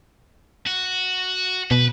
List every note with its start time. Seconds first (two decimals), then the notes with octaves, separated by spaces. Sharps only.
0.67 F#4
1.71 B2 B4